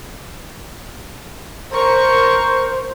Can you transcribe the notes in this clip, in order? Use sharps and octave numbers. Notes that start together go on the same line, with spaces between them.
A#4 C5 C#6